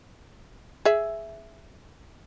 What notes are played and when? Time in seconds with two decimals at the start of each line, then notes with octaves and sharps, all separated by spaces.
0.85 G#4 E5